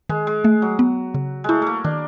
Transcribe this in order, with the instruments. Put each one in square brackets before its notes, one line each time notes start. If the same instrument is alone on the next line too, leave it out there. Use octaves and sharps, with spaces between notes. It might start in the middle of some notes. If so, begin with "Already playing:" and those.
[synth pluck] D#3 [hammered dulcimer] G#3
[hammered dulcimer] G#3
[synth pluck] A3
[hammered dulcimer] F#3
[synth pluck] B3
C#3
[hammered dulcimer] G#3 A3 [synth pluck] E4
[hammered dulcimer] A3 A#3
[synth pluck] D#3 [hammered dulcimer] D4